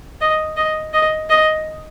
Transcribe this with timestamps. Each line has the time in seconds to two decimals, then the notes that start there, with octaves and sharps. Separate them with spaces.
0.21 D#5
0.57 D#5
0.93 D#5
1.30 D#5